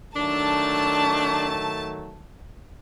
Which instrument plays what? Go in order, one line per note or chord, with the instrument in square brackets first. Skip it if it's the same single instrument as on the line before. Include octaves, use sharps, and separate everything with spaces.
[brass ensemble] D#3 F#3 A3 [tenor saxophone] D4 [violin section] A5